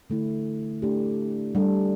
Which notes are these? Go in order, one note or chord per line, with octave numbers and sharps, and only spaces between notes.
D3 A3 E4
A3 D4 G4
G3 D4 A4